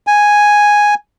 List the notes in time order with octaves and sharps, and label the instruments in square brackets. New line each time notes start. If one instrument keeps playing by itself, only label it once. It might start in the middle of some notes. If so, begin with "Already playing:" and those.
[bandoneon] G#5